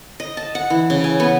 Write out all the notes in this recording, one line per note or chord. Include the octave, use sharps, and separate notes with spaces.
D#5
A5
F#5
E3
C#3
G#5
B3